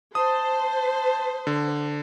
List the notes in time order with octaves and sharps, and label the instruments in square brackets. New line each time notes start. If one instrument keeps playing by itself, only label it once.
[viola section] C5 [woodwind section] A5 [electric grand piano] D#6
[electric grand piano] D3